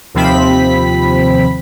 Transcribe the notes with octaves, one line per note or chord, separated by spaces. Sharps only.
D#2 C3 F3 C4 B5 B6